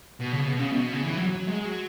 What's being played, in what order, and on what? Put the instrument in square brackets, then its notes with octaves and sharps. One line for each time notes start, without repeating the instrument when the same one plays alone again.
[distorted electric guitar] B2
C#3
B2
C#3
B2
C#3
E3
F#3
F#3
G#3
F#3